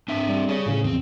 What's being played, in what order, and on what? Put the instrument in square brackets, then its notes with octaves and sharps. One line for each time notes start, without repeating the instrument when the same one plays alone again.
[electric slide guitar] C4 D4 E5
[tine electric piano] G3
[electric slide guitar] G#4 C#5
[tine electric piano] A2 C#3 F3
[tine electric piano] E2 [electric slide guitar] C4